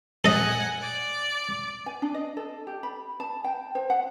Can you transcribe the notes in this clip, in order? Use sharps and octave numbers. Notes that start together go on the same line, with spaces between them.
A4 D#5 F#5 G#5
D5
G#5
D4
D#5
A4
G4
B5
A5
G5
C5
F#5